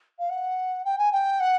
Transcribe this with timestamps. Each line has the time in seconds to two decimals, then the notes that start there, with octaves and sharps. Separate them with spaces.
0.18 F5
0.29 F#5
0.84 G5
0.98 G#5
1.11 G5
1.40 F#5